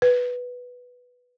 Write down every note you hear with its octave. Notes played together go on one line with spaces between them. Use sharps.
B4